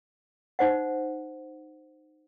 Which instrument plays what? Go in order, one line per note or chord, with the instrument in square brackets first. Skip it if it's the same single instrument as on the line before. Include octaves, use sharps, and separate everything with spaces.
[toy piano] D#4 C5 F#5